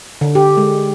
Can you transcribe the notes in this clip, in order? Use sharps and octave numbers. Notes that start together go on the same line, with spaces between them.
D3
G4
G#3